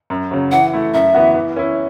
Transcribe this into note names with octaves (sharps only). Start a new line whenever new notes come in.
F#2
C#3 F#3
E3 F#5
A3 E4
F#2 E5
E3 B3 F#4
E3
C#4 E4